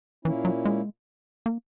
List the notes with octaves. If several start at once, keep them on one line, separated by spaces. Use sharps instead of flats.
A#2 E3 A#3 C#4 E4
F#3
G#3
A#3